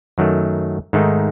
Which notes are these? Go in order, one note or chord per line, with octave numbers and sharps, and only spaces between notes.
F#2 D#3 F#3 A3
G#2 D#3 A3 D#4